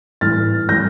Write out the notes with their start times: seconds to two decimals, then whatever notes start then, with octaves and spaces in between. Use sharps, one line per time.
0.21 A2 E3 G3 F6 A6
0.69 A2 E3 G3 G6 A#6